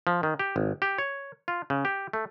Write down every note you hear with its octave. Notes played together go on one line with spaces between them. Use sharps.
F3
D#3
G4
G#1
G4
C#5
F4
C#3
G4
A3